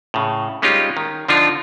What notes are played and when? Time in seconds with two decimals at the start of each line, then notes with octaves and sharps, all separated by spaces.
0.14 A2 C#3
0.62 G3 G#3 C#4 D#4 F4 G4
0.97 D#3
1.28 D3 F3 D4 D#4 F4